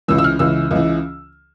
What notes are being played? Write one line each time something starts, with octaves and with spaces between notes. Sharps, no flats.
C#2 C#3 E3 E6
E6
F6
C#2 C#3 E3 E6
C#2 C#3 E3